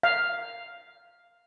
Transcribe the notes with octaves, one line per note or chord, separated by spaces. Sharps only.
F5